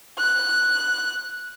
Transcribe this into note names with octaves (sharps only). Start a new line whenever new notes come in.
F#6